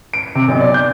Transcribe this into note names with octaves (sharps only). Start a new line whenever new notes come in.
D7
C3
B1
D5
G6